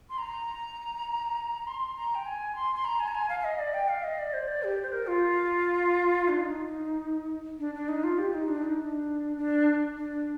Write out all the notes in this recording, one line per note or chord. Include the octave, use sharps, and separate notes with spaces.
C6
A#5
C6
A#5
G5
G#5
C6
C6
A#5
G#5
A#5
G#5
F5
F5
D#5
D5
G5
F5
D#5
D5
C5
D5
G4
C5
A#4
F4
D4
D#4
D4
D4
D#4
F4
G4
D#4
D4
D#4
D4
D4
D4